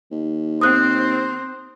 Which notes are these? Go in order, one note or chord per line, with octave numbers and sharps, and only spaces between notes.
D#2
C4 C5 D#6 F#6